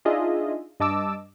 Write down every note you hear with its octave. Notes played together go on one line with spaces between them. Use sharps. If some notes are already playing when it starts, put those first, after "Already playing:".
D4 D#4 F4 G#4 D#5 E5
G2 D#5 A5 D6 E6